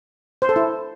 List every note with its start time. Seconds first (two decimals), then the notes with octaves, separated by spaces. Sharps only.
0.42 C5
0.49 A4
0.56 E4